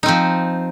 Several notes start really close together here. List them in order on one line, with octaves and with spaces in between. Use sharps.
D#4 C4 F3